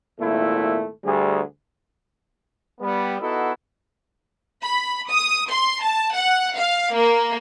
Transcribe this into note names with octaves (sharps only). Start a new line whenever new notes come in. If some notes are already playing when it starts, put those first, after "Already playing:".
G#1 A#2 A3 E4
D2 G3 G#4
G3 B3
B3 D#4 E4 F#4 A4
B5
D#6
C6
A5
F#5
F5
A#3